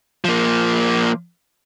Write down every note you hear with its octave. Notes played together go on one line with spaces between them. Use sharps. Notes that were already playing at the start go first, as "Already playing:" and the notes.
F3 A#3